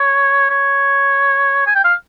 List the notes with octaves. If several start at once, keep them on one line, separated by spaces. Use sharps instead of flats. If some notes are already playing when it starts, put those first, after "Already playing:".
Already playing: C#5
C#5
G#5
G5
F5